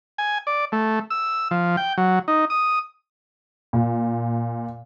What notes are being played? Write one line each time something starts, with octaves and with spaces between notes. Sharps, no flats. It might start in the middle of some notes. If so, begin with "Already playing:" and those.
G#5
D5
A3
E6
F3
G5
F#3
D#4
D#6
A#2